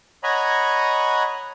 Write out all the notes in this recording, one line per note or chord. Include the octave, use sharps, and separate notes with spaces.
C#5 D#5 F#5 G#5 A#5 B5